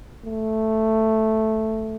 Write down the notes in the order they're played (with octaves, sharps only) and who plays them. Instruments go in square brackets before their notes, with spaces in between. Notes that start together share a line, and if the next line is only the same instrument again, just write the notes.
[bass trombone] A3